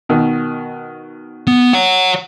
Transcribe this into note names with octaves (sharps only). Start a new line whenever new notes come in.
B2 D#3
B3
C#5 F#5